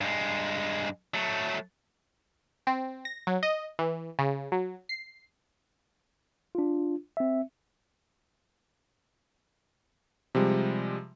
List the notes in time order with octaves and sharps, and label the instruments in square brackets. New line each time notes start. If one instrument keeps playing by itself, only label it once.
[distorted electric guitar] G2 G#3
F#3 A3
[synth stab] C4
A#6
F#3
D#5
E3
C#3
F#3
C7
[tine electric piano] D4 F4
C4 E5
[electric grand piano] C3 F3 G3 G#3